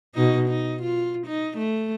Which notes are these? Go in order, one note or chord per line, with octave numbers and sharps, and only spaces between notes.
B2 D#4
D#4
F4
D#4
A3